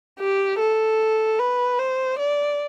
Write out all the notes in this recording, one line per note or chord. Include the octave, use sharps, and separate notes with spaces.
G4
A4
B4
C5
D5